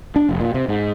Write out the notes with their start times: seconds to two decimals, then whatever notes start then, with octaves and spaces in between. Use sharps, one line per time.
0.16 D4
0.29 F1
0.41 A#2
0.54 C3
0.68 G#2